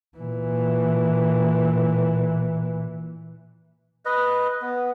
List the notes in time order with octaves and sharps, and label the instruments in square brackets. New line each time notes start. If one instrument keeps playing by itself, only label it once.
[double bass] A#2 E3
[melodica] B4 D#5
B3